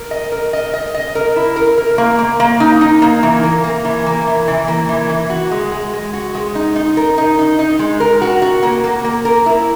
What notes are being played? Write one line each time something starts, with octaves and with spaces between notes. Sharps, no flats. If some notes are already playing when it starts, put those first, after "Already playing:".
Already playing: A#4
D#5
A#4
D#5
D#5
D#5
A#4
E4
A#4
A#4
A#3
A#3
A#3
D#4
D#4
A#3
E3
A#3
A#3
E3
A#3
E3
E3
A#3
E3
E3
F#4
G#3
G#3
G#3
F#4
G#3
D#4
D#4
A#4
D#4
D#4
D#4
G#3
A#4
F#4
F#4
A#3
A#3
A#3
A#4
E4